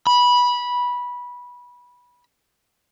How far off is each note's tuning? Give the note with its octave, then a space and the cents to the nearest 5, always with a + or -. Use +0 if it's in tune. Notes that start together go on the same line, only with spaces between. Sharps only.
B5 -15